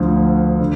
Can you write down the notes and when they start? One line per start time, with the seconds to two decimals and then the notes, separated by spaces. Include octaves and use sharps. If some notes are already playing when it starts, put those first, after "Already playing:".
Already playing: D2 D3 F3
0.60 D3